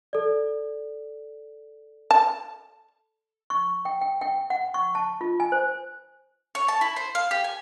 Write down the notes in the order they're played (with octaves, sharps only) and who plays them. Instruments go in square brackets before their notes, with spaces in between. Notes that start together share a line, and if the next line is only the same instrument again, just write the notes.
[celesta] A4 D5
[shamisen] A5
[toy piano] C#6
G5
G5
G5
F#5
C#6
A5
F4
G#5
C5
[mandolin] C#5
A5
E4
C5
F5
G4
G#5